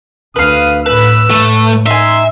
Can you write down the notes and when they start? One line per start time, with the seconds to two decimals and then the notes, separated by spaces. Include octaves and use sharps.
0.36 D2 B4 F5 D#6
0.86 A2 B4 E6
1.30 A2 A3
1.86 D#4 E5 G#5 C6